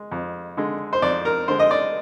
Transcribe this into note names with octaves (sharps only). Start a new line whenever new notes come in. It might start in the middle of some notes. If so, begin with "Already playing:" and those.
Already playing: G#3
F2
D3 G#3
C5
F2 D5
A#4
D3 G#3 C5
D#5
D5